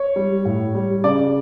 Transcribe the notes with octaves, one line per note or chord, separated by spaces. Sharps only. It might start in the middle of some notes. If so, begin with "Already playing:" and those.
Already playing: C#5
G3
A2
G3
C#3 D5